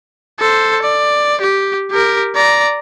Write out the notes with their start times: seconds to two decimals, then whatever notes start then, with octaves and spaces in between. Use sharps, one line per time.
0.40 A4 C5
0.82 D5
1.41 G4
1.91 G4 A#4
2.35 D5 A#5